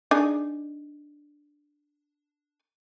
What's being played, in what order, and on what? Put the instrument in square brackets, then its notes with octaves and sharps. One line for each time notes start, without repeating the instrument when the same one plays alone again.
[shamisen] D4 D#4 G#4